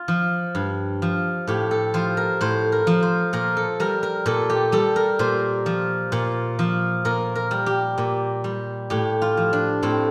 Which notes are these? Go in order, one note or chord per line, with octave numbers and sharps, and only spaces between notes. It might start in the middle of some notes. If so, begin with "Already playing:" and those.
Already playing: F4
F3
G2
F3
A2 G4
A4
F3 C5
A#4
A2 C5
A#4
F3
C5
A#2 A#4
A4
G3 A#4
A#4
A#2 A4
G4
G3 A4
A#4
A#2 C5
F3
A#2
F3
A#2 A#4
A#4
G3
G4
A#2
G3
A2 G4
F4
F3
D4
A2 C4